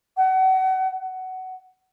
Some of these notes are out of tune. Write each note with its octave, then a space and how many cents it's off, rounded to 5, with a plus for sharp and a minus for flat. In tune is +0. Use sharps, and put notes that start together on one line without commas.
F#5 +30
F#5 +15